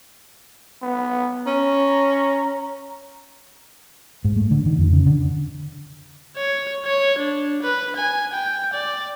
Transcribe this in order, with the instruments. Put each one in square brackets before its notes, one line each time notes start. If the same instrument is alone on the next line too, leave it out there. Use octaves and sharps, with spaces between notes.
[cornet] B3
[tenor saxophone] C#4 [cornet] A#5
[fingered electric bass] G#2
A3
D3
D#3
F2
C#3
D3
[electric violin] C#5
C#5
D4
B4
G#5
G5
D5